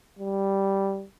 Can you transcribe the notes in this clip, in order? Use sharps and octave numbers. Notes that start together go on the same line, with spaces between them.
G3